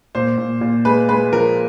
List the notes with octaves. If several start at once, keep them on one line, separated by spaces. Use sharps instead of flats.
A#2 C5
A#2
A#2
G#3 B4
G#3 B4
F3 A#4